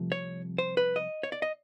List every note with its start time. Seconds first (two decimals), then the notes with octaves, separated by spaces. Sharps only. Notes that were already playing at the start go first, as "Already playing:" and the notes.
Already playing: C2 C3 F3 A3
0.12 C#5
0.58 C5
0.77 B4
0.96 D#5
1.23 C#5
1.32 D5
1.42 D#5